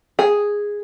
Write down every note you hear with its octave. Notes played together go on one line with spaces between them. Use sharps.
G#4